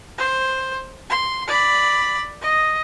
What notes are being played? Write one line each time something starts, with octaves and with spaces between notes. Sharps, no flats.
C5
C6
D5 B5
D#5